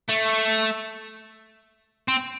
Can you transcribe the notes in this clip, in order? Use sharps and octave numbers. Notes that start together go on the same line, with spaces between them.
A3
C4